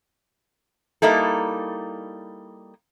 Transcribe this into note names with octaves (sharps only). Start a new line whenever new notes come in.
G3 A#3 D#4 E4 A4